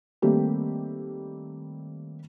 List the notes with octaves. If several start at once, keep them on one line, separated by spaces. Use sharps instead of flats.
D#3 G3 A3 A#3 C4 G4